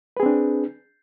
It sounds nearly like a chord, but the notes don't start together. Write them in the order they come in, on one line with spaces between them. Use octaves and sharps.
B4 G#4 C4 D4